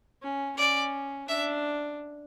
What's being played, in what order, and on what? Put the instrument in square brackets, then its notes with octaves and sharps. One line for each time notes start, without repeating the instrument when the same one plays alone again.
[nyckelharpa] C#4
[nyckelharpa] C#4 [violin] D5
[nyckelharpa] D4 [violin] E5